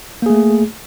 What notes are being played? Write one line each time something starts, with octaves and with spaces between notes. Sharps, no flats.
A3 A#3 G#4